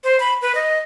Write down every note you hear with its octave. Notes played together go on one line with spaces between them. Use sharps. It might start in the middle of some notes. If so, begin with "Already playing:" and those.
C5
B5
B4
D#5